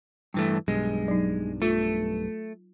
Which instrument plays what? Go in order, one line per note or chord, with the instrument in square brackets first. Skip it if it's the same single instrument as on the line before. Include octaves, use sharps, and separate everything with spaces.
[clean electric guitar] G2 E3 A3
[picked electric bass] B1 G2 [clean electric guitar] G#3
[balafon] F#3 D#4
[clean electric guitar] A3 [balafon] F4